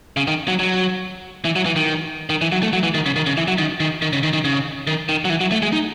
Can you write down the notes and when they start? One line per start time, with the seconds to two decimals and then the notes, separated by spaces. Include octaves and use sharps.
0.17 C#3
0.27 D#3
0.48 F#3
0.60 F#3
1.45 E3
1.56 F#3
1.66 E3
1.76 D#3
2.30 D#3
2.41 E3
2.52 F#3
2.63 A3
2.73 F#3
2.83 E3
2.94 D#3
3.06 C#3
3.16 D#3
3.26 C#3
3.37 E3
3.48 F#3
3.58 D#3
3.80 D#3
4.02 D#3
4.13 C#3
4.23 D#3
4.33 D#3
4.44 C#3
4.87 D#3
5.09 D#3
5.25 F#3
5.30 E3
5.41 F#3
5.52 A3
5.62 G#3
5.72 D#4